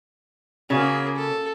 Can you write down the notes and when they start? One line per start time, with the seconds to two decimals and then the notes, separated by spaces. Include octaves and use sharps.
0.70 C#3 A#3 C#4 F#4 G#4 F5
1.16 A4